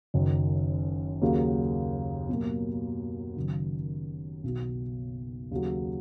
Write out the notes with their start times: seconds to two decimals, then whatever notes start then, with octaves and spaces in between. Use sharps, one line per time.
0.14 F#1 F#2 D#3
1.21 D#2 C#3 F#3 A#3 C#4
2.29 B2 F#3 A#3
3.36 F#1 F#2 D#3
4.44 B1 B2 F#3
5.51 D#2 C#3 F#3